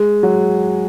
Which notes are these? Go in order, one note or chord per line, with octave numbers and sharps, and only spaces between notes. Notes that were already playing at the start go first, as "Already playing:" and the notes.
Already playing: G#3
F#3